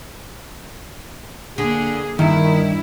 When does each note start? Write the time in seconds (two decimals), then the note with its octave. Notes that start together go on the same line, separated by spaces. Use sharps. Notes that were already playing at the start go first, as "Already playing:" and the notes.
1.58 D3 A#3 G#4
2.19 G2 D#3 E4